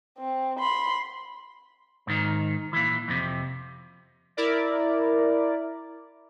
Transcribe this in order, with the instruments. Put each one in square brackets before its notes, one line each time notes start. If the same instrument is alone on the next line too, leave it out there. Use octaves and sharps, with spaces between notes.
[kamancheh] C4
B5 C6
[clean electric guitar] G#2 D#3
A#2 E3
F2 C3
[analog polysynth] E4 A#4 D5